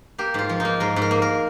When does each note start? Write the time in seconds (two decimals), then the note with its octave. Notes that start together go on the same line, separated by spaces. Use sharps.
0.18 A#3 G4
0.34 G#2 F4
0.49 F3
0.60 A#3 D#4
0.80 G#2 A#4
0.96 G#2
1.02 A#4
1.11 A#3
1.22 A#4